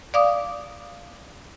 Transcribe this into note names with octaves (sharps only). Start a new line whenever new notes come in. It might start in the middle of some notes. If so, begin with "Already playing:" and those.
D5 F5 D6 D#6